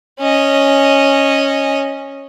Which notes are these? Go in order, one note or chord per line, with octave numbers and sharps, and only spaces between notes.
C#4 D#5